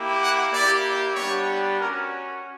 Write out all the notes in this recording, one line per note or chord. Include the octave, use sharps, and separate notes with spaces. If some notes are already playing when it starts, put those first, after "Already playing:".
Already playing: A#3 E4 G4
F#5
A#3 E4 G4 D5
G3 B3 D4 G4 C#5
C#4 F#4 A#4